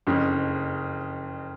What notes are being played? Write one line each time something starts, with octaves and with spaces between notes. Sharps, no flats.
F#1 F2 C#3